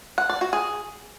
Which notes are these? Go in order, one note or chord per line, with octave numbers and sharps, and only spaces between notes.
F#5
D5
F#4
G#4